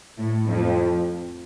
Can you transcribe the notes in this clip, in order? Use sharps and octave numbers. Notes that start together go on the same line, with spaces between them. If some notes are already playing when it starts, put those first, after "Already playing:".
A2
F2